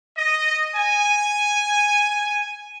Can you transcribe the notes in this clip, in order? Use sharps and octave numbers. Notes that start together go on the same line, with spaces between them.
D#5
G#5